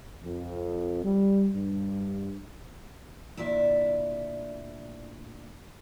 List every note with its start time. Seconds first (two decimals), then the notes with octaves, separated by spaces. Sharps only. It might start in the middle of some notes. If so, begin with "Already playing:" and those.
0.24 F2
1.04 G3
1.55 G2
3.37 D2 A#2 E4 D5 E5